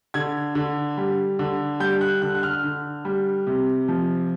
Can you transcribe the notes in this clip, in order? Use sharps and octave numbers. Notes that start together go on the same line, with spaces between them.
D3 G#6
D3
G3
D3
G3 G6
F#6
D3 F#6
F#6
F6
D3
G3
C3
F3